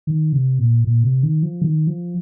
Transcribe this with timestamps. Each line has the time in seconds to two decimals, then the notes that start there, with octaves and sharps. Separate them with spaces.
0.07 D#3
0.33 C3
0.59 A#2
0.84 A#2
1.03 C3
1.23 D#3
1.43 F3
1.62 D#3
1.87 F3